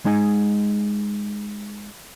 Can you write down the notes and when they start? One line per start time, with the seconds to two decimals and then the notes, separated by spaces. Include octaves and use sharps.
0.05 G#3 D#4 D#5 G#5